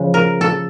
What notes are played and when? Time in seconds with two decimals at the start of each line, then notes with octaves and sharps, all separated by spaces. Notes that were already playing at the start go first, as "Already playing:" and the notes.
Already playing: C#3 F3 G#3
0.14 A#4
0.41 A4